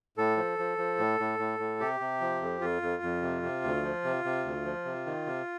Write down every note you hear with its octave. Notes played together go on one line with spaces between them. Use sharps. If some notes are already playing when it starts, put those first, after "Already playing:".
A2 A4
F3
F3
F3
A2
A2
A2
A2
C3 G4
C3
F3
F2
F2 F4
F2
F2
C3
C3
D2
F3
C3
C3
D2
F3
C3
D#3
C3